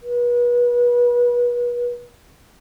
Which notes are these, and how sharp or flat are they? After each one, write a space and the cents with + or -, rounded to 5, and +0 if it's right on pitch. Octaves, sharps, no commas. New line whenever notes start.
B4 -35